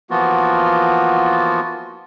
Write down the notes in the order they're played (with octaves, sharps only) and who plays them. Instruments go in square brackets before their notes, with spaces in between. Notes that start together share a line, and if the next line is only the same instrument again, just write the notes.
[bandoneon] E3 F3 A#3 B3 F4 F#4